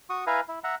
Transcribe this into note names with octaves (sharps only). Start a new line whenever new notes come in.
F#4 C#6 D#6
E4 B4 F5 G#5 A#5
E4
E5 F#5 A#5